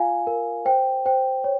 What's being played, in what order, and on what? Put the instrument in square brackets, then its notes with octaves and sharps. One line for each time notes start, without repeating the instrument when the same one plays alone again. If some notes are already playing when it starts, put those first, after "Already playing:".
Already playing: [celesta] F4 F5 G#5
A#4
C5 G5
C5 G5
C#5